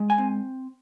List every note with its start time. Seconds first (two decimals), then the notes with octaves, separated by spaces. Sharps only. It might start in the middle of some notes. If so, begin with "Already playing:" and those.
Already playing: G#3
0.10 G#5
0.18 C4